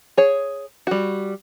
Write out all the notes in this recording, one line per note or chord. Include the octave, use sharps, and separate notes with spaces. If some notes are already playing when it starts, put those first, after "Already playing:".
G#4 C#5
G3 F#4